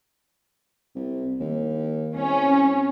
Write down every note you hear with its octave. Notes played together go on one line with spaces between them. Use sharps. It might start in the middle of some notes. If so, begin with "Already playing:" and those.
C2
D#2
C2 C#4